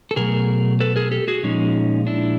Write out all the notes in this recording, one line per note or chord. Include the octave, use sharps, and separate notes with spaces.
A4
B2 F#3 A3 G#4 A#4
A4 B4
G#4 A#4
G4 A4
F#4 G#4
A#2 F3 G#3 C#4 D#4
D4 E4